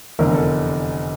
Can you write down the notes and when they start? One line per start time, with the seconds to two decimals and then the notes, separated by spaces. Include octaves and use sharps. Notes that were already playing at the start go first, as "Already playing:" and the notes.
0.19 F1 E2 D3 A#4
0.34 A4